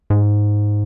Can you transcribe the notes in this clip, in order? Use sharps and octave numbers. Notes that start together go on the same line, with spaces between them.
G#2